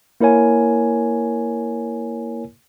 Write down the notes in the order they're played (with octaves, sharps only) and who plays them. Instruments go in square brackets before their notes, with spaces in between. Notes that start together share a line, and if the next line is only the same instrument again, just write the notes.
[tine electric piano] A#3 E4 A#4 C#5 G#5